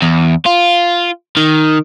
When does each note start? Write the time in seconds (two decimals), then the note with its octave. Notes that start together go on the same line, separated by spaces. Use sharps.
0.02 E2
0.46 F4
1.37 D#3